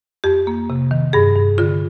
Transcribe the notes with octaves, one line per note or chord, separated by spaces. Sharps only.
F2 G4
A#3
C3
D#3
G2 G#4
G2
D3 F4